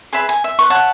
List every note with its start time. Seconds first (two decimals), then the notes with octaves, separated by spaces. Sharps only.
0.13 G#4 B4 E5 B5
0.29 G#5
0.44 E5
0.59 B4 C#6
0.70 C#5 E5 F#5 A5